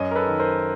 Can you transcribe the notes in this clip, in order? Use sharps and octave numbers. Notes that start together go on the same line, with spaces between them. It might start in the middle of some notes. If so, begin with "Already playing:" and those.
Already playing: F#2 C#5 D#5
A#4
A4 B4
D#3
A#4 C5